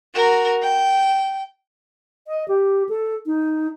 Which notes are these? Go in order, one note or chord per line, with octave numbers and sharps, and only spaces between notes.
F#4 A#4
G5
D#5
G4
A4
D#4